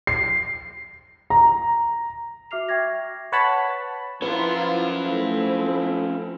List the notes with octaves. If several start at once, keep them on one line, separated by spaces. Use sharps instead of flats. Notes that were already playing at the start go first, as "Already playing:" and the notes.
C7
A#5
F#4 E5 D6 F6 C7 F7
E5 G5 C#6 D6 G#6 A#6
B4 C#5 F#5 A5 B5
F3 C#4 E4 F4 A#4 B4 F#5
A3 C4 E4